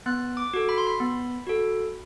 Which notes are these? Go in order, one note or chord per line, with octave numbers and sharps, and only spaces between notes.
B3 F#6
D6
F#4 A4
B5
C6
B5
B3
F#4 A4